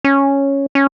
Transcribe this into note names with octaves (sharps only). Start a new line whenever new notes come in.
C#4
C#4